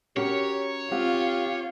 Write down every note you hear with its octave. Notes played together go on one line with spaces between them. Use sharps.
C#4 F#4 G4 A#4 C#5
C4 F4 G4 F5 F#5